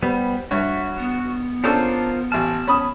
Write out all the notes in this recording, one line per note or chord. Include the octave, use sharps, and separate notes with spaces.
G3 B3 C5
G2 F#4 C#5 E5
B3
C#4 D4 F4 A4 A#4 C5
A1 A5 F6
C#4 B5 D#6